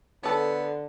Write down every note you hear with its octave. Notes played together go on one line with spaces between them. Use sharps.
D3 B3 A4 C#5